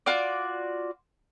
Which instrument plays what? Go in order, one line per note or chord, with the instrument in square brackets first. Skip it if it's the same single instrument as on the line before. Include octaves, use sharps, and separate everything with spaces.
[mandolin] F4 F#4 D5